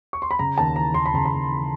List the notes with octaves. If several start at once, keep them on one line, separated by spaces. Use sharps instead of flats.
C#6
C6
B5
C#3 A#5
D#2 A5
E3 A#5
D#2 C6
B5
C#3 A#5
B5
D#2
E3